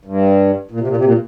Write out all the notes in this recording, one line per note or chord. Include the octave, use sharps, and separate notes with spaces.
G2
A#2
C3
A#2
C3
A#2